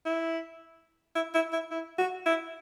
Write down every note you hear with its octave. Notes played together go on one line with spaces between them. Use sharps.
E4
E4
E4
E4
E4
F#4
E4